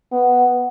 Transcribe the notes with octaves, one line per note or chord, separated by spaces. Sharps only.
B3